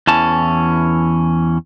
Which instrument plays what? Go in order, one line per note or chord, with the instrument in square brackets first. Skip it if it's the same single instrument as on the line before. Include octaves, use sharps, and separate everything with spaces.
[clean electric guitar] E2 E3 C#4 A5